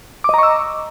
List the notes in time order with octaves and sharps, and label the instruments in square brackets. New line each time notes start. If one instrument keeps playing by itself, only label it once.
[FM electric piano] D6
D#5
A#5
C#6
E6